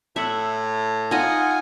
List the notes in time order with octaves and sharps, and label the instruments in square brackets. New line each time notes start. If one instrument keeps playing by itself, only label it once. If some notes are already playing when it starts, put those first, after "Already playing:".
[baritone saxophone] A2 [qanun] E5 F#5
[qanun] D#4 D#5 [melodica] F4 G#5 [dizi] F#5